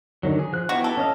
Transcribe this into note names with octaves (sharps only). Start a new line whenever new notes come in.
D3 D#3 F#3
G#4
F3 F#6
B3 E4 F#4 G4
A4
C#4 D#5 F5